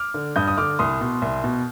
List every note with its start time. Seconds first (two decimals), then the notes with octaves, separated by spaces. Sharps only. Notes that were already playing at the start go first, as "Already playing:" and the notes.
Already playing: D6 F6
0.14 D3
0.36 G2 D#6 G6
0.48 D#6
0.57 D3 D6 F6
0.79 C2 C6 D#6
1.01 B2
1.22 C2
1.44 B2